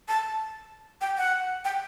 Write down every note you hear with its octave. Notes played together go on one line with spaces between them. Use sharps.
A5
G5
F#5
G5